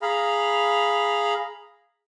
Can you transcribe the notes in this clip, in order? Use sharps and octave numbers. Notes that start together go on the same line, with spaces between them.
G#4 F5 A#5 B5